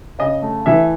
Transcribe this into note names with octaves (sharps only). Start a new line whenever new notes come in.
C#3 D#5
A3
E3 E5